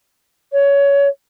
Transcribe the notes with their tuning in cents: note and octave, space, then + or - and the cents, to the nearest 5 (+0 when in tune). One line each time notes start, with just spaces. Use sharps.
C#5 +20